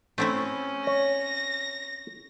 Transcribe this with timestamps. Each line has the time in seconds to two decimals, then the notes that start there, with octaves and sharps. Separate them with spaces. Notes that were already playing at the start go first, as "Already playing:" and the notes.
0.18 A3 C4 C#4 E4
0.87 C#5 A#6